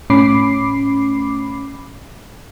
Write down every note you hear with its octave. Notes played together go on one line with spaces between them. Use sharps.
A2 C#4 B5 D6 C7